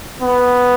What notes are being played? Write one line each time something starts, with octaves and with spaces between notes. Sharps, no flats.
B3